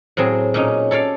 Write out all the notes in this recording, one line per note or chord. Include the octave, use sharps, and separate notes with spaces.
A2 F#3 C4 G#4
A#2 C#4 D#4
A4 C#5 D5 F5